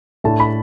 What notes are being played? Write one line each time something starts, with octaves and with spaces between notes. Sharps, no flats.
A2 A3 D4 A5
B5